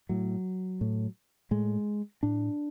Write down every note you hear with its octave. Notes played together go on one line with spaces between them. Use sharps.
A2 F#3
A2
A2 G#3
A2 D4